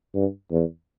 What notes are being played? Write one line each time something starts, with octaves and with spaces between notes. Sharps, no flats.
G2
E2